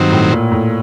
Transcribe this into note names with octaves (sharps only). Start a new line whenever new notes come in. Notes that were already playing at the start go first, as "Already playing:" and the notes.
Already playing: G2 D#3 F#3 C4
A2
A#2
A2